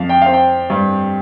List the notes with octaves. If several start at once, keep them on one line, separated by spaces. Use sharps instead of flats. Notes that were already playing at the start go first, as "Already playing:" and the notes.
Already playing: F2 F5
G5
C4 F5
G5
G2